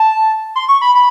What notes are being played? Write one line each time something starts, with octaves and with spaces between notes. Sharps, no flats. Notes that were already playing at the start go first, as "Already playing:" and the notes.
Already playing: A5
C6
C#6
B5
B5